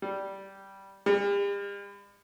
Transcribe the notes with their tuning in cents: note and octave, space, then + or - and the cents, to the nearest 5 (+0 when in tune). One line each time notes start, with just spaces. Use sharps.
G3 -10
G3 +40